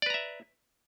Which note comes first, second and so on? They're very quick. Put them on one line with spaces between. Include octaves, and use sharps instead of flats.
D5 B4 A#5 E5